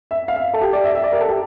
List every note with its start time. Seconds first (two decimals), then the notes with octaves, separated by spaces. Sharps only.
0.11 E5
0.28 F5
0.36 E5
0.54 A4
0.61 G4
0.73 D5
0.84 E5
0.95 E5
1.03 D5
1.12 A#4
1.21 A4
1.29 G4